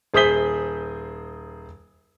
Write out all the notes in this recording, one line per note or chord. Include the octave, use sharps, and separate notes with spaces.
D#1 G#4 C5 D#6 B6 G7